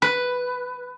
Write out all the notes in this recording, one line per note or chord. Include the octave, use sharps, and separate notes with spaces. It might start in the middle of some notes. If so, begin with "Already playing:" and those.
B4